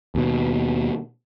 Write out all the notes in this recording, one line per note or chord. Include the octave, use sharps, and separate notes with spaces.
D#2 B2